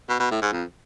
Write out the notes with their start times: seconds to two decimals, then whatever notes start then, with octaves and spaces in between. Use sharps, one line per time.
0.09 B2
0.19 B2
0.31 A2
0.42 G#2
0.52 F2